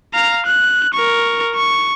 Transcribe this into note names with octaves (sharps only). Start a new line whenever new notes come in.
F5 A#5
F#6
A#4 C#6
C#6